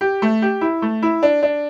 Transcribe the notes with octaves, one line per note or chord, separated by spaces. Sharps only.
G4
A3
G4
E4
A3
E4
D4
D4